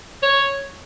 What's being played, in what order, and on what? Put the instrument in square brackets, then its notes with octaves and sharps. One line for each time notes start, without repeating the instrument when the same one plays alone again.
[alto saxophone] C#5